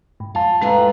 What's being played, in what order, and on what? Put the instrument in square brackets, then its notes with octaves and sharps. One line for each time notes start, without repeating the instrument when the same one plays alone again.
[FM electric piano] G#2
[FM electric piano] F2 A5 [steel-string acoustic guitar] F4
[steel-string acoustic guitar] A2 F4 B4 [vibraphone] G#3 A#5